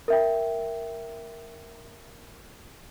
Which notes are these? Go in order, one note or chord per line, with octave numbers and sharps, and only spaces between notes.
A#4 E5 G5